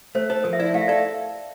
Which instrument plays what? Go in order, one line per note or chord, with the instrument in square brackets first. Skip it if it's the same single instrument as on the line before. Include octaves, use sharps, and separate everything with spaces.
[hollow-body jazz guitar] A3 [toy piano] C5
[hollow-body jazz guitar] A4 [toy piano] C5
[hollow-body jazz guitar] F3 [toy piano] A#4
[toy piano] E5
[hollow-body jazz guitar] E4 [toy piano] D5
[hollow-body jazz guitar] A3 [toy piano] F5
[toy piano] E5
[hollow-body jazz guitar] A4 [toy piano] D5
[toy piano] E5